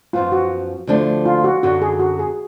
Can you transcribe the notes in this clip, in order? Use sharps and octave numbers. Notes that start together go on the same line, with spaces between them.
F#2 F3 B3 F4
F#4
D2 D3 F3 A3 D4
F4
F#4
F#2 D3 F#3 F#4
G#4
F#4
G#4